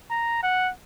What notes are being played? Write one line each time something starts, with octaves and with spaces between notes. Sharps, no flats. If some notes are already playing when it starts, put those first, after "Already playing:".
A#5
F#5